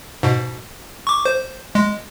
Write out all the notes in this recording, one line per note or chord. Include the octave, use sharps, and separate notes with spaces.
G#2 B2
C#6 D6
C5
G#3